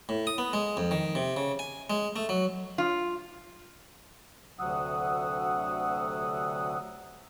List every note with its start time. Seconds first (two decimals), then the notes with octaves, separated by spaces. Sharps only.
0.09 A2
0.27 D#6
0.38 B3
0.53 G#3
0.77 F2
0.91 D#3
1.15 C3
1.36 C#3
1.59 G#5
1.90 G#3
2.16 A3
2.29 F#3
2.78 F4
4.59 D2 C3 F#3 F#5 D#6 E6